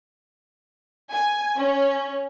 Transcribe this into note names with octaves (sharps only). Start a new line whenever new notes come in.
G#5
C#4